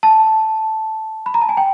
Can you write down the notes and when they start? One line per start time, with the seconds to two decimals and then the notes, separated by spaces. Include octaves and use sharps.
0.03 A5
1.26 B5
1.34 A#5
1.41 A5
1.49 G#5
1.57 G5